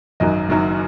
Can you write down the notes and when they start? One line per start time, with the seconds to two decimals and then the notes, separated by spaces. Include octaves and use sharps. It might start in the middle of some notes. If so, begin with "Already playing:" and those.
0.20 G#1 F#2 D#3 F#3 D#5
0.49 F#1 F#2 D#3 F#3